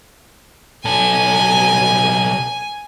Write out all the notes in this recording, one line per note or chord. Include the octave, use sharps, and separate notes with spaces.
B1 A4 G#5